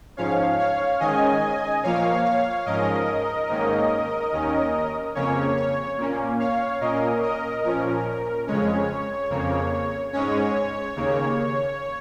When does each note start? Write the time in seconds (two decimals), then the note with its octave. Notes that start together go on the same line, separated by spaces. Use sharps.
0.17 G#2 F3 C#4 C#5 F5
0.59 C#5 F5
1.00 G#2 D#3 G#3 C#4 D#5 G#5
1.83 A#2 F3 A#3 C#5 F5
2.25 C#5 F5
2.66 G#2 F3 C#4 A#4 D#5
3.49 G#2 D#3 A#3 C#4
4.32 D#2 D#3 C#4
5.15 F2 C#3 A#3 C#4 C#5
5.57 C#5
5.98 A#2 A#3 C#4
6.39 C#5 F5
6.81 A#2 A#3 C#4 A#4 D#5
7.22 A#4 D#5
7.64 A#2 F3 C#4 A#4
8.47 F2 C#3 G#3 C#4 C#5
9.30 F2 C#3 A#3
10.13 G#2 G#3 C#4 C#5
10.96 D#2 C#3 A#3